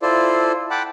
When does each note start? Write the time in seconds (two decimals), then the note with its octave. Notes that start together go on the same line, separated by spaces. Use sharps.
0.02 E4 F4 A4 C5 D5
0.71 F#5 G5 A5 B5 D6